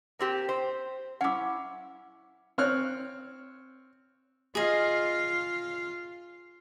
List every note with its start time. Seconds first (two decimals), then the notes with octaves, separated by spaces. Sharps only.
0.19 A#3 C4 G4
0.49 C5
1.21 C#4 E4 F#5 D6
2.58 C4 C#5 F6 F#6
4.55 F4 G#4 D#5 F5